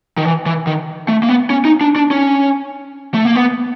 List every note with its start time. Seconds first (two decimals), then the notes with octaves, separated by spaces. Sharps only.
0.17 D#3
0.25 E3
0.46 E3
0.67 D#3
1.08 A3
1.23 A#3
1.29 B3
1.50 C#4
1.65 D#4
1.81 D4
1.96 D4
2.11 C#4
3.14 A3
3.25 A#3
3.35 B3